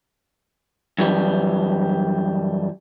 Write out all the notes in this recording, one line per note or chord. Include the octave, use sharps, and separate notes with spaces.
F#2 E3 G3